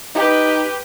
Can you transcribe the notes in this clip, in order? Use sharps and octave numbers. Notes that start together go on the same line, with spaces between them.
D#4 G4 B4